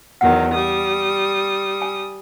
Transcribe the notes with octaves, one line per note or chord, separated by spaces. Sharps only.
E2 D#3 F#3 F#5
G3 D#6
G#5